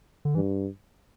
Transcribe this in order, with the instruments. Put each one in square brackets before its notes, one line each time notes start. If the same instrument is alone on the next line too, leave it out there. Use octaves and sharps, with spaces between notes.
[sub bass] D3
[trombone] G2 [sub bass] E3